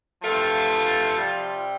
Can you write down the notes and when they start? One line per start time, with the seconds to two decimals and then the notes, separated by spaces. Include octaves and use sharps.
0.23 G2 E3 F3 A3 F4
1.14 C3 G3